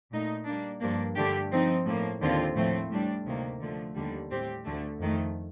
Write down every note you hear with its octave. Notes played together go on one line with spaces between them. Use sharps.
A#2 A3 D#4
G3 A#3 D4
G2 F3 A#3 D4
G2 D3 A3 D4 G4
F3 C4 D#4
A2 F3 A#3
D#2 D3 F3 C4 F4
A2 F3 A3 C4
A2 G3 D4
D2 C3 D#3 A#3
D3 F3 A3
D#2 D3 G3
A2 G3 C4 G4
D2 D3 A3
F2 D#3 A3